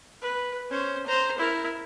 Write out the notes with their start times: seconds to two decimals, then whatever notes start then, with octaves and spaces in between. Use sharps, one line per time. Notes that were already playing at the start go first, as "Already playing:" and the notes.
0.22 B4
0.70 C#4 C5
1.07 C5 A#5
1.38 E4 A#4